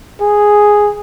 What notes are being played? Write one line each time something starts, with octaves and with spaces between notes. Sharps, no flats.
G#4